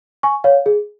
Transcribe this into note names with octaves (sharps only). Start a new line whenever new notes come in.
G#5 C#6
C#5 F5
G#4